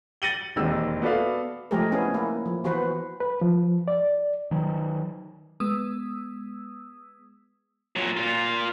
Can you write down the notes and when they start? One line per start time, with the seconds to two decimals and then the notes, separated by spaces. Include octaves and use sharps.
0.22 A6 A#6 C#7 D#7 F#7 G7
0.56 E1 D#2 G#3 A#3 C4 E6
1.02 B3 F#4 A4 D5 E5 F5
1.71 F3 G#3 A3 G4 G#4 A#4
1.92 B3 C#4 E4 G#4
2.14 A#3 E4
2.46 F3
2.64 E3 B3 F#4 B4 C5
3.20 B4
3.41 F3
3.88 D5
4.51 D#3 F#3
5.60 G#3 B3 D#6 E6
7.96 A#2 F#3
8.17 A#2 F4